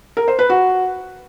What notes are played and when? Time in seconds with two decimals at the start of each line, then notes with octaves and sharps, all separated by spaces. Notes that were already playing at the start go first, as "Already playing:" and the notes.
0.17 A#4
0.28 C5
0.39 B4
0.50 F#4